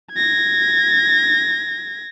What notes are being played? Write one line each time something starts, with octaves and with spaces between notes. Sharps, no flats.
G#6 A#6